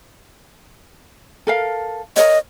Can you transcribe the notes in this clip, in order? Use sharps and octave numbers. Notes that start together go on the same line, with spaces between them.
A4 A#4 F5
A#4 C#5 D#5